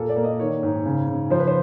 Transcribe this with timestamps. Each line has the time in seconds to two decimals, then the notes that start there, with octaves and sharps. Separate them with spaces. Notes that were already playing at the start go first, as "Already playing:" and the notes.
Already playing: A#2 A#3 A4
0.09 D5
0.16 A#3
0.24 D#5
0.40 D#3 C#5
0.63 G#2
0.86 C#3
1.07 C#3
1.30 F3 C5
1.39 B4
1.47 C5